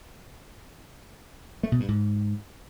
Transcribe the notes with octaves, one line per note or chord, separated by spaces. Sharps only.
A3
B2
G2
G#2